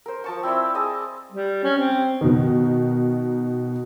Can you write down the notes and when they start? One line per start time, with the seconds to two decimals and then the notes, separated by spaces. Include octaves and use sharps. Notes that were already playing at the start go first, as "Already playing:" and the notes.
0.06 A#4 C5
0.24 F3 A5 C#6
0.43 C4 E4 D5 E5
0.74 G#4 D#5 A5
1.32 G3
1.64 C#4
1.78 C4
2.21 B2 D#3